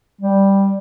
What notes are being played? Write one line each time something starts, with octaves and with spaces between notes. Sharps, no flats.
G3